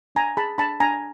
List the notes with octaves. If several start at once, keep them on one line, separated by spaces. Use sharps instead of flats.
D4 G#5 A#5
G#4 A5 B5
D4 A5 B5
D4 G#5 A#5